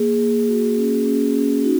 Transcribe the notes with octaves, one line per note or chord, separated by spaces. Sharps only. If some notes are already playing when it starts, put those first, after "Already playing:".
Already playing: A#3 G#4
A#3
F#4
C#4
C#4
C#4
D#4 F#4